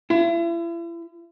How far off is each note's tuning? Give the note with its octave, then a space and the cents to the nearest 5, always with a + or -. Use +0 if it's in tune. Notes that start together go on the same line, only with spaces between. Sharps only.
E4 +40